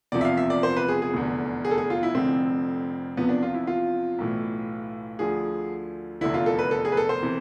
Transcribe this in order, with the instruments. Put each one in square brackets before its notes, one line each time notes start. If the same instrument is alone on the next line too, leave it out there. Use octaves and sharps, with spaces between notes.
[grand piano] F1 E2 C3 F3 D5
E5
F5
E5
D5
C5
B4
G#4
G#4
F1 E2 D3
G#4
A4
G#4
F4
E4
F1 F2 D3 C4
E2 C3 F3 B3
D4
F4
E4
F4
B1 A2 E3
D2 D3 F3 G#4
F1 E2 D3 E4
F4
A4
B4
A4
G#4
B4
A4
C5
C3 E3